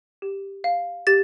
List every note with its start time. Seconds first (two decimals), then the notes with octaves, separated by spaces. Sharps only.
0.22 G4
0.64 F5
1.07 G4 A6